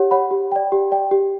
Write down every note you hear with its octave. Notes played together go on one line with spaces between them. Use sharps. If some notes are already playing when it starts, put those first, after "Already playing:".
Already playing: G4 C#5 F#5
C#5 F#5 B5
G4
D5 G5
G4
D5 G5
G4